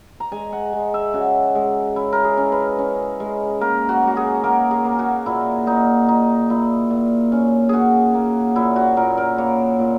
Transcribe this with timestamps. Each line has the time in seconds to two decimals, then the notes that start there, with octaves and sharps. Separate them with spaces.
0.20 A#5
0.32 G#3 G#5
0.53 F#5
0.73 G#3
0.94 E5
1.14 C#3 F#4
1.55 G#3
1.96 C#4 E4
2.13 A#4
2.24 G#4
2.37 C#4
2.52 B4
2.79 C#4
3.20 G#3
3.61 A#3 A#4
3.89 F#4
4.03 A#3 F#4
4.17 G#4
4.44 A#3 A#4
4.71 G#4
4.85 A#3
4.99 F#4
5.26 A#2 E4
5.67 A#2 D#4
6.08 A#2 D#4
6.50 A#2 E4
6.91 A#2
7.32 C#4
7.69 C#4 F#4 G#4
8.14 A#3
8.56 A#2 E4
8.76 F#4
8.97 A#2 A#4
9.18 A#4
9.38 A#3 C#5
9.79 A#2